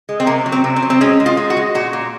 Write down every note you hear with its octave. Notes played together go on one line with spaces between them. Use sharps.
G#3
C4
C3 A#3
F#3
C4
C3
C4
F#3
C4
G#3 C#4
G#3
F4
G#3
F#4
G#3
A#2 F#4
A#2